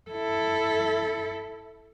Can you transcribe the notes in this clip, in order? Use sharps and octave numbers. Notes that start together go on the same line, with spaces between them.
E4 A4